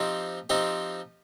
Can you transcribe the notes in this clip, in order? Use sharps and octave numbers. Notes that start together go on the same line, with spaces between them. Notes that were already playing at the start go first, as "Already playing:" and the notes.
Already playing: F3 C4 D#4 G4
F3 C4 D#4 G4